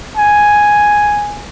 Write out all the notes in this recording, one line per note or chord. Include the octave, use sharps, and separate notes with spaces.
G#5